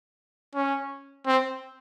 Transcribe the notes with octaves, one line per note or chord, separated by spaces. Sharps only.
C#4
C4